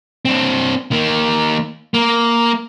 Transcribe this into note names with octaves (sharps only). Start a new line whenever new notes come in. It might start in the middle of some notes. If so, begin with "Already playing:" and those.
C4 D4
D#3 A#3
A#3